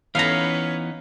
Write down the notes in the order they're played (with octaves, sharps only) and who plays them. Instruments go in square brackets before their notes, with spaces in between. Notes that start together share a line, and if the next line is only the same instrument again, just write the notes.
[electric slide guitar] E3 B3 D#4 [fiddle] C#4 B4 [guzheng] F5 A#5